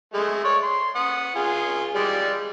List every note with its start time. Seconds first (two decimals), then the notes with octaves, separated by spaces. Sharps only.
0.14 G#3 A3
0.45 C#5 D5
0.63 C6
0.95 F#5 D#6
1.36 F4 G#4
1.95 G3 G#3 D5